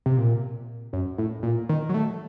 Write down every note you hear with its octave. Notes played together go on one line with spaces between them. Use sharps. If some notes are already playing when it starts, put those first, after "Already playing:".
C3
A#2
F#2
A2
A#2
D#3
F#3
A3